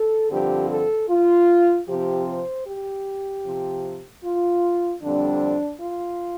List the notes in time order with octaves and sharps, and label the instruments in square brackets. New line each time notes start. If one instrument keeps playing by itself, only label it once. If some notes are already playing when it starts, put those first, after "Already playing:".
Already playing: [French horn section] A4
G2 D3 F3 C4 G4
A4
F4
C3 F3 C4 G4
C5
G4
C3 F3 C4
F4
F2 D3 G3 C4 D4
F4